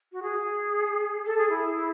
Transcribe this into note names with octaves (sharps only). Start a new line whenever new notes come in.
F#4
G#4
A4
G#4
E4